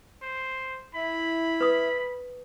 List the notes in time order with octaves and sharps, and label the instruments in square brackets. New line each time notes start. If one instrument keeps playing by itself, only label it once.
[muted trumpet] C5
[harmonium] E4 [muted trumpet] B5
[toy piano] B4 D#6